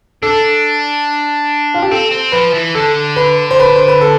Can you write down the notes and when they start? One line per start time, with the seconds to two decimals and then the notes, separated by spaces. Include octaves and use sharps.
0.23 D4 A4
1.74 F4
1.82 G4
1.91 C4 A4
2.11 C4
2.32 F3 B4
2.53 E3
2.74 D3 A4
3.16 B4
3.51 C5
3.59 B4
3.76 C5
3.88 B4
4.01 A4